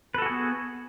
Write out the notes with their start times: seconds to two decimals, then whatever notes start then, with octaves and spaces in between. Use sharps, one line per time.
0.14 B4
0.18 A4
0.22 F#4
0.26 G#4
0.30 B3